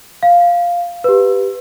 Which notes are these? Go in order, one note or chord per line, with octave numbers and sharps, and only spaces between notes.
F5
G4 B4